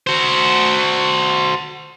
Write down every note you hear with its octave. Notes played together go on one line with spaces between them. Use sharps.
F#4 C5